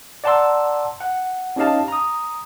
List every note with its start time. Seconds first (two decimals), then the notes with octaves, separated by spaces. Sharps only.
0.24 D5 F#5 A5 A#5 C6 E6
1.01 F#5
1.56 C#4 D#4 G4 D#5 F5 A5
1.88 A#5 D#6